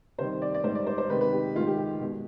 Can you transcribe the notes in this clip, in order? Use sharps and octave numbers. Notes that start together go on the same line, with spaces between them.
C3 D#3 G3 C5
D5
D5
G#2 G3 C5
D5
C5
C5
C3 D#3 G#3 B4
B4
G4
G#2 D#3 G#3 F4
G4
G4
B2 G#3